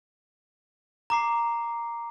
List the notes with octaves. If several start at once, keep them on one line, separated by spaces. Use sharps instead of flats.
A#5 D6 C7